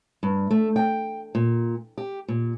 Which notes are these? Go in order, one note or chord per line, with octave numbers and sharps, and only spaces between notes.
G2
A3
G5
A#2
G4
A#2